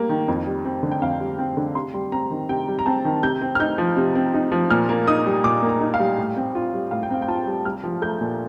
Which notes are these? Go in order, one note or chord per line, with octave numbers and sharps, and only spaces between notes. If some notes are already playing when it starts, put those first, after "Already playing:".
Already playing: G3 A#3
D#3
F2
G3
C4
D3
G5
F2 F5
G3
C4
D3
C3 C6
G3
C4 A#5
D#3
C3 G5
G3
A#5
C4 A5
D#3
C3 G6
C4
F6
D#4 G6
F3
C3
C4
D#4
F3
A#2 F6
A#3
D#4 D#6
G3
A#2 D6
A#3
A#5
D#4
F5
G3
A2
C4
F4
G3
A2 F5
G5
C4 F5
G5
F4 A5
G3
C2 F6
F3
A3 G6
A#2